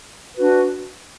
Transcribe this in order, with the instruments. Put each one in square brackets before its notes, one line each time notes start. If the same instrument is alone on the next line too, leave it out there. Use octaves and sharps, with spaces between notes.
[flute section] D4 F#4 B4